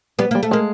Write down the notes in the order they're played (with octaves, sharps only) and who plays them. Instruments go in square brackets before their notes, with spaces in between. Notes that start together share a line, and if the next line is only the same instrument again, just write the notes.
[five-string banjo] G3 [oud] B3
[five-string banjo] G3 [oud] A#3
[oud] A3
[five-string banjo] G#3 [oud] A#3